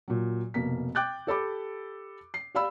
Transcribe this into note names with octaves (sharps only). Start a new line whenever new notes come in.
A#2 F#3
F1 B2 A#3 B6
G5 D6 F#6 G6 A6
G4 A4 B5 D6
C7
G4 D5 F5 B5 E6